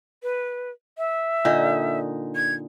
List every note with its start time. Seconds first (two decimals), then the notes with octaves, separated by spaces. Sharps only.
0.23 B4
0.98 E5
1.45 A#2 D3 D#4
2.36 G#6